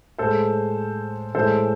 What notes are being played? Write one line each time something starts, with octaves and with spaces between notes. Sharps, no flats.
A2 G#3 A4 C5
A2 E3 G#3 A4 C5